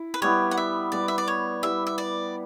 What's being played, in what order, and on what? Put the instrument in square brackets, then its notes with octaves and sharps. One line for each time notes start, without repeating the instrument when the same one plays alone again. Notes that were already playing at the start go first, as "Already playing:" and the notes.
Already playing: [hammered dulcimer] E4
[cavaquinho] B4
[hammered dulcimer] G3 B3 E4 [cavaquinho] C#5
[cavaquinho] F#5
E5
[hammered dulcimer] G3 B3 E4 [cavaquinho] D5
[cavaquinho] E5
D5
C#5
[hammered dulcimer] G3 B3 E4 [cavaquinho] E5
[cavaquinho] E5
D5